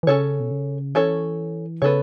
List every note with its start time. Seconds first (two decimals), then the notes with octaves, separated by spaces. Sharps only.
0.03 E3
0.07 C#3 C#4 A4 C#5
0.40 B2
0.51 C#3
0.95 E3 C#4 A4 C#5
1.82 C#3 B3 A4 C#5